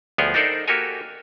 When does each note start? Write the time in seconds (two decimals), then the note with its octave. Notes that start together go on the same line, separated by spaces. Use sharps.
0.18 D2 F3 B3 G#4 C#5 G5
0.34 D4 D#4 A4 A#4 C5 D5
0.68 A#3 F#4 G4 A4 A#4 G#5